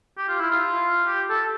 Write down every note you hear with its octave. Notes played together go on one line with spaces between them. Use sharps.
G4
F4
E4
F4
G4
A4